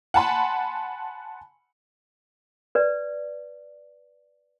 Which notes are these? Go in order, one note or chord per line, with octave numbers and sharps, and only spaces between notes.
F#5 G#5 A5 B5 C6
B4 D5